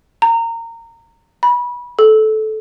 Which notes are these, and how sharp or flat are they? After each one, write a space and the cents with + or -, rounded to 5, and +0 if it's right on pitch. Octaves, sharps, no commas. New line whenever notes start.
A#5 -20
B5 -25
A4 -15